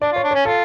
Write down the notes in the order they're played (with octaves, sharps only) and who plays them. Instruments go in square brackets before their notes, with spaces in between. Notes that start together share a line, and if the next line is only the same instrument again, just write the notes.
[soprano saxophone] D4 [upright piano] D5
[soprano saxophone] F4
[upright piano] C#5
[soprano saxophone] D4
[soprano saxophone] C#4 [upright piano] C#5
[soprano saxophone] F4 [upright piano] A4